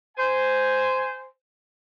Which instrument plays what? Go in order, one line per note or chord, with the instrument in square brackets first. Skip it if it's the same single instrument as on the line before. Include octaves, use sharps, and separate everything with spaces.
[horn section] C5 G#5